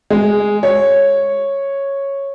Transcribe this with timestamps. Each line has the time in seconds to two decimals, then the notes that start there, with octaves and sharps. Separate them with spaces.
0.10 G#3
0.63 C#5